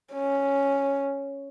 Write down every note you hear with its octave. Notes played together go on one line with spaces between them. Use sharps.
C#4